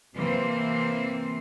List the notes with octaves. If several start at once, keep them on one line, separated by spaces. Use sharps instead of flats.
C3 E3 A#3 C4 C5